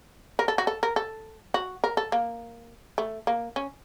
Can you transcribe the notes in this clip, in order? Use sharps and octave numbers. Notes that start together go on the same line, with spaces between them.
A#4
A4
F#4
A4
A#4
A4
F#4
A#4
A4
A#3
A3
A#3
C#4